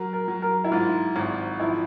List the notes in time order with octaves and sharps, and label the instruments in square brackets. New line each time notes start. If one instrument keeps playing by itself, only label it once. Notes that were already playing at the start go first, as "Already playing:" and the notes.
Already playing: [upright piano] F#3 [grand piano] A#4
[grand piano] A#4
[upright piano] F#3
[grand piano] A#4
E4
[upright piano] G#2 [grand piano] F4
[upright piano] G#1
[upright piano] F3 [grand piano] E4